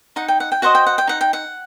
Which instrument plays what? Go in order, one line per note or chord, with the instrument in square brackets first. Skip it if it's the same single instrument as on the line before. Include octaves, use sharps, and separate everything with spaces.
[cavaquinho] D#4 F#5
G5
F#5
G5
F#4 C5 D#5 F#5
G5
F#5
G5
D#4 F#5
G5
F#5